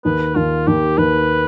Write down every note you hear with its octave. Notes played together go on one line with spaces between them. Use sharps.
D#2 B4
D#2 F4
D#2 G4
D#2 B4